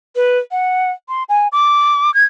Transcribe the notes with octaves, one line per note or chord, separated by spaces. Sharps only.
B4
F#5
C6
G#5
D6
G#6